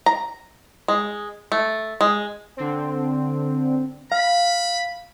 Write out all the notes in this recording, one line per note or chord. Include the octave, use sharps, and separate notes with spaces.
A#5
G#3
A3
G#3
D3 C4
F5 B5